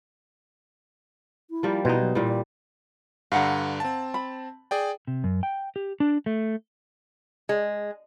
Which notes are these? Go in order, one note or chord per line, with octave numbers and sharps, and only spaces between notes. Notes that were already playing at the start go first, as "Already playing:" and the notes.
E4
F3 G3 A#3
B2 D#4 E4 C5
F#3
A#2 E3 G3 E4
D5
G2 D3 F5 F#5 A#5
C4 A5
B5
G#4 D5 G5
C3
F#2
G5
G4
D4
A3
G#3